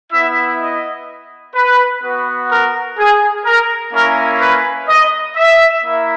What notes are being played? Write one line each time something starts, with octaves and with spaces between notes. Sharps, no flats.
B3 E4 E5
D#5
B4
B3 F#4
A#4
G#4
A#4
A#3 C#4 E4 A#4
B4
D#5
E5
A#3 E4